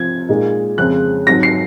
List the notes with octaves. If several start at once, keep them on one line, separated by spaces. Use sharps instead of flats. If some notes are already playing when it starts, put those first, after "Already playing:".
Already playing: C3 F3 C4 G#6
A#2 G#3 D#4
F2 C#3 G#3 C4 F#6
G#2 F#3 C4 A#6
C7